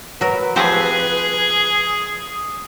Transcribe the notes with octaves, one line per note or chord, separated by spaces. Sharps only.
F#3 A#4 B4
F3 C4 G4 G#4
D#6